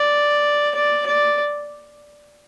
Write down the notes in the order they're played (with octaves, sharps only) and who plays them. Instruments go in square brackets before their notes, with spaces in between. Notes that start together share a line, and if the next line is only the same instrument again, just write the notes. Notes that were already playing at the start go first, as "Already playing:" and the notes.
Already playing: [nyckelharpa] D5
D5
D5